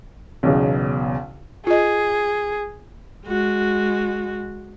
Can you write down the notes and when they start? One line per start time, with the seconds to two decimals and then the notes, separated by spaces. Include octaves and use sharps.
0.43 B1 E2 C#3
1.67 F4 G#4 D#5
3.26 G#3 F#4